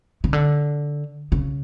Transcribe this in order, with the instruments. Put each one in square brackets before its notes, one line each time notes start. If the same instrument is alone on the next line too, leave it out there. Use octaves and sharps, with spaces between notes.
[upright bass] C#3
D3
C#3